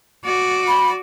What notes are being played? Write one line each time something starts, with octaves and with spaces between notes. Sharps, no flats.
F#4 D5
B5